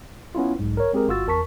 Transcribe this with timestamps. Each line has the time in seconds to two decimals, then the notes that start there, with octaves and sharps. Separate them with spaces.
0.35 B3 C#4 E4 F4
0.59 B1 G#2
0.77 A#4 C#5
0.93 G#3 C4 G4 G#4 A#4
1.08 G1 F4 F#4 E6 A6
1.27 E2 A#4 A5 C#6 B6